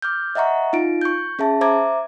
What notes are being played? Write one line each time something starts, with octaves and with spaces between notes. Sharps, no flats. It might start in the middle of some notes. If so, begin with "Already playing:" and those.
D6 F6 G6
D#5 E5 F#5 A#5 C#6
D#4 F4 D7
C#6 G6
C#4 G#4 E5 A5
C5 E5 A#5 D6 G#6